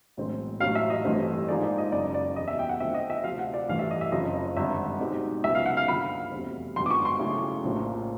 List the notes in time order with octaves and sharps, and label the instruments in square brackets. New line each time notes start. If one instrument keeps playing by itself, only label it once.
[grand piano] B1 A2 E3 G#3 C4
[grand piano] A1 A2 F#3 [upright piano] F5
[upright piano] E5
D#5
[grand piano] A1 G2 E3 A3 C4
[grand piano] G#2 F3 A#3 D#4 G#4 [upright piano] D5
[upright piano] D5
D#5
[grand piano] F#1 F#2 C#3 [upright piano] D5
[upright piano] D5
[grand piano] E1 E2 B2 G3 [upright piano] D#5
[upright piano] E5
G5
F#5
[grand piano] D3 F3 A3 C4 [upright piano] E5
[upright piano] D#5
E5
[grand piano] D2 C3 F3 [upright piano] F5
[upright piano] F#5
D5
[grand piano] A1 G2 E3 A3 [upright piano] F5
[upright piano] E5
D#5
E5
[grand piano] F#1 F2 C#3 F3 [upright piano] D#5
[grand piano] G#1 G2 D3 [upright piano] E5
[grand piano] B2 G#3 C4 D#4 G4
[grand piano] C#2 C#3 F#3 B3 [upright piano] E5
[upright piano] F5
F#5
F5
[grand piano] G2 D3 F3 A#3 [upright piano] B5
[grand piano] F1 E2 B2 G3 C4
[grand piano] G#1 G2 D3 F#3 B3 [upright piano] C6
[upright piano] D6
C#6
C6
[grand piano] C#3 F#3 A3 C#4 E4
A#1 A2 F3 A#3